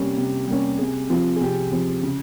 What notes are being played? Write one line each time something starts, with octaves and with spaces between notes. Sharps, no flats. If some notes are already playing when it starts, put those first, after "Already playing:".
Already playing: C3 G3 A#3 C#4
C3
G3 A#3 C#4
C3 G#4
F3 C4 F4
G#4
C3 G4
F3 C4
C#3